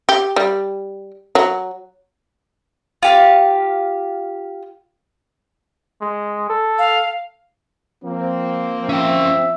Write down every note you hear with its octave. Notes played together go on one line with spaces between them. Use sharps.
G4
G3
F#3
F4 G4 F5
G#3
A4
F5
F3 A#3 C4
C#4 E5 G5